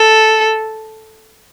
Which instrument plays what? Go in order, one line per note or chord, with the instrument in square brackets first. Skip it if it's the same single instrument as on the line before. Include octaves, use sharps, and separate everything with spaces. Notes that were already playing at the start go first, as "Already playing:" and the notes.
Already playing: [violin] A4